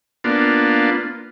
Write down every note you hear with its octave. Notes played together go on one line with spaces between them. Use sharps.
A#3 B3 D4 F4